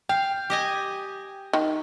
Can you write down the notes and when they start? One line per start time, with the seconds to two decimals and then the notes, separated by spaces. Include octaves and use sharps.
0.09 F5 G5
0.50 G4 D#5 G#5
1.53 D#3